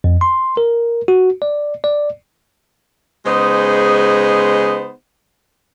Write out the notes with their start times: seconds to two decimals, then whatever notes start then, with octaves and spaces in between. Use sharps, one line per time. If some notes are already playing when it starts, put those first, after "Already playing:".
0.04 F2
0.21 C6
0.57 A#4
1.08 F#4
1.42 D5
1.84 D5
3.26 C#3 G#3 B3 D#4 G#4 C5